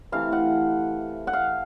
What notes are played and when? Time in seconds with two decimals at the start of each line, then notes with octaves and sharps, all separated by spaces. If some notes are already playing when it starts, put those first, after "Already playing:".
0.12 C3 E3 A3 F5
0.32 F#5
1.27 F#5
1.33 F5